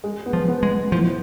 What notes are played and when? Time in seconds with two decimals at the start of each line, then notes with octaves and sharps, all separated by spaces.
0.04 G#3
0.26 B3
0.33 F3
0.48 B3
0.63 G#3
0.71 B3
0.92 A2 F3